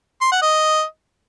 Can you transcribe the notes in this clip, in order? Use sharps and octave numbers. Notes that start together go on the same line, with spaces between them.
C6
F#5
D#5